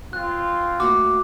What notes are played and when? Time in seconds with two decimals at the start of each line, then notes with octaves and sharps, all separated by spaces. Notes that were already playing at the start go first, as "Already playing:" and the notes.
0.13 C4 F4 F#6
0.80 A2 A#3 F#4 D6